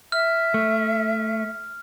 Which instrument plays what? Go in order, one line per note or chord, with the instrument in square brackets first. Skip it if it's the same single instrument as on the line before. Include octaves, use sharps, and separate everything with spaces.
[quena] E5 [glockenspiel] F6
[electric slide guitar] A3